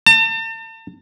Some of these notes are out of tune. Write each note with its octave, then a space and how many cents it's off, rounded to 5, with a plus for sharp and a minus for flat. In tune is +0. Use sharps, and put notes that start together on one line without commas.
A5 +40